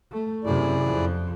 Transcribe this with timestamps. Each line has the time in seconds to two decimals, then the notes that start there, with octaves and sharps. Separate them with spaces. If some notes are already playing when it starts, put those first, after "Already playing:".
0.12 A3
0.44 F#2 C3 E4 G#4 D5
0.84 F2 F3